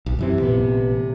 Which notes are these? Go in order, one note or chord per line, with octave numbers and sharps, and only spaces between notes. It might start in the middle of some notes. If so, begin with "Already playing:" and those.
B1
F#2 C3 E3 C4
A1 A#2 B3